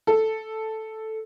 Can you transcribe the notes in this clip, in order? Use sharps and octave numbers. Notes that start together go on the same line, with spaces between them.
A4